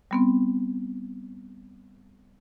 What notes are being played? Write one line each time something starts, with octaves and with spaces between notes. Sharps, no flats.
G3 B3 C4